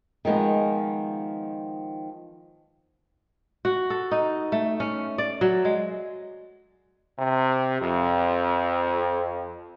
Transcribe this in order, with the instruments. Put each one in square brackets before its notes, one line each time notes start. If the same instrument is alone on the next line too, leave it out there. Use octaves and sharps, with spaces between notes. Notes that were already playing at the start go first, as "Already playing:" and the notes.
[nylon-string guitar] D#3 F3 G#3 B3
[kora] F#4
A4
D#4
A3
C#4
D5
F#3
G#3
[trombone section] C3
F2